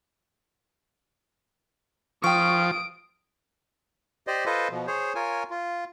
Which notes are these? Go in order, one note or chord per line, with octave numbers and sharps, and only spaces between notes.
F3 G5 C#6 D#6 D7
G4 C5 D5 D#5
F4 A4 B4 C5 D#5
B2 F3
G#4 C5 C#5
F4 A#4 C#5 G#5
F4